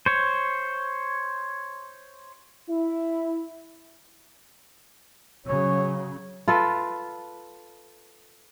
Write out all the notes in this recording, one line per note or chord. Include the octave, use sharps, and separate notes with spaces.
C5 C#5
E4
C#3 F#3 C#5
F4 A4 B4